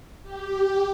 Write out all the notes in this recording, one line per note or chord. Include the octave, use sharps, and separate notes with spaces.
G4